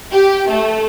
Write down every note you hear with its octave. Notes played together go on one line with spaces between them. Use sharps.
G4
A3